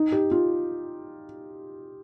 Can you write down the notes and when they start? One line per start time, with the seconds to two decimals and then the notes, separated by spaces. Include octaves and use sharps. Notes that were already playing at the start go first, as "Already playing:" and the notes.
Already playing: D#4
0.12 G4
0.31 F4